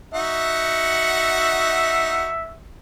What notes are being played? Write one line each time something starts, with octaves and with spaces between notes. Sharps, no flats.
D#4 F#4 E5 F#5